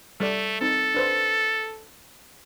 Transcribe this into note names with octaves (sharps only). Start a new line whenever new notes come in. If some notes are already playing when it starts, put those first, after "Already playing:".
G3 A3 A4 D5
C4 D#4 A4
D4 B4 C5